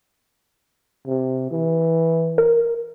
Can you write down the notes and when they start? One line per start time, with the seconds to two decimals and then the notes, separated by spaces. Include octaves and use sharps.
1.07 C3
1.51 E3
2.38 A#4